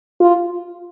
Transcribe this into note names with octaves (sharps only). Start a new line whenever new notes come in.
F4